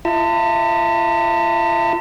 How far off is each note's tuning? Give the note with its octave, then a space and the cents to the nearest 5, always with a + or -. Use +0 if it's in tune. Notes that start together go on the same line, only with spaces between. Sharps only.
F4 -45 E5 -25 A5 +35